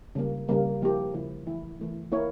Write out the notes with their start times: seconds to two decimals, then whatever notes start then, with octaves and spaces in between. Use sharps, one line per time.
0.15 C#3 G3 A#3
0.49 C#3 G3 A#3
0.81 C#3 F3 A#3 E4 G4
1.14 C#3 F3 A#3 E4 G4
1.46 E3 A3 E4
1.80 E3 A3 E4
2.12 A#3 E4 A#4 C#5